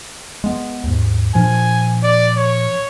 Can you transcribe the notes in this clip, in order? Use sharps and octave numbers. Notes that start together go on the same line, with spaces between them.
G#3 B3
D#2 G#2
A#2 F3 D4 G#5
D5
C#5